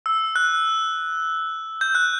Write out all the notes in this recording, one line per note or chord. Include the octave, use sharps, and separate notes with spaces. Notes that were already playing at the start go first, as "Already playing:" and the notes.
E6
F#6
G6
F#6